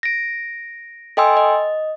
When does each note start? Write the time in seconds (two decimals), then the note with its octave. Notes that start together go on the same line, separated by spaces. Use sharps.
0.03 A#6 D7
1.17 A4 D#5 G5 G#5 C6 E6
1.37 D#5